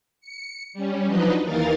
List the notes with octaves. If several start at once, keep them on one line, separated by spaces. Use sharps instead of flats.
C#7
G3 C#4
F3 F#3 D4 D#4 B4 D#5
D#2 E3 D#4 A#4 F5 A6